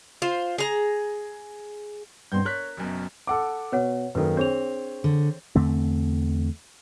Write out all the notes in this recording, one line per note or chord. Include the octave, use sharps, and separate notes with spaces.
F4 C5
G#4 A#5
G2 B2 C4 C6 G6
A#4 C#5 F#6 B6
F#1 F#2 B2
A4 F#5 D6
B2 B4 C#5 F#5
F#2 D#3 A#3 A4 B4
C4 D4 G#4 C5 C#5 F7
D3
E2 D3 A3 C4